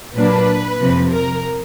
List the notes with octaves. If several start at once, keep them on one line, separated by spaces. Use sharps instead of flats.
A#2 F#3 A#3 D4 B4
F2 C3 F3
A#4